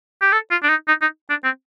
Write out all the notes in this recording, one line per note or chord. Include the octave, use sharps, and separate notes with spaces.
G4
A4
F4
D4
D#4
D#4
D#4
D4
C4